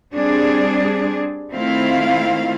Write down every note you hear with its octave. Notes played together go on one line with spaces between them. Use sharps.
G3 C4 D4 G#4
D#3 A3 C4 E4 F4 F5